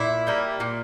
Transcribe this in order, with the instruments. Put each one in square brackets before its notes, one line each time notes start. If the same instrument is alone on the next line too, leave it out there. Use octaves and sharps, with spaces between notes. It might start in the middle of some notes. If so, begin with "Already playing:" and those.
Already playing: [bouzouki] A#2 E4
G3 A#3
A#2